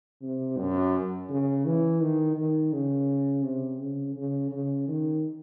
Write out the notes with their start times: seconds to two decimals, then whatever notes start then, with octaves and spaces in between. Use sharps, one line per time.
0.22 C3
0.58 F#2
1.29 C#3
1.65 E3
2.01 D#3
2.36 D#3
2.72 C#3
3.44 C3
3.80 C#3
4.16 C#3
4.51 C#3
4.88 D#3